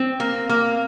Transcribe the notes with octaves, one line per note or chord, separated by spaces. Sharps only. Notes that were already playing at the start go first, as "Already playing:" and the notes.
Already playing: C4
A#3
A#3